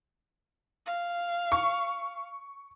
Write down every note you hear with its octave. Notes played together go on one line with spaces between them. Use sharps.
F5
C#6